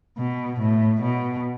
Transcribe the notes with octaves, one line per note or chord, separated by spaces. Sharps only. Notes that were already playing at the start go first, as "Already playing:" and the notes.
B2
A2
B2